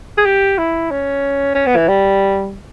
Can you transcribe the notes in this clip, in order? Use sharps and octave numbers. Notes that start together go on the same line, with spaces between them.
G#4
G4
E4
C#4
C#4
B3
E3
G3